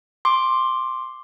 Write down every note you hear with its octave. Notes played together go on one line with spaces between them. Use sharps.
C6 D6